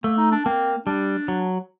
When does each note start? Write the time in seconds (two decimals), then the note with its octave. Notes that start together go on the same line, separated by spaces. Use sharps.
0.04 A3 A#3
0.18 D#4
0.32 D4
0.46 A#3 C4
0.87 G3 D4
1.28 F#3